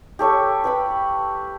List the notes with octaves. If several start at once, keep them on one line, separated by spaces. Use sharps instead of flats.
G4 A4 C#5 E5
B4 G5 B5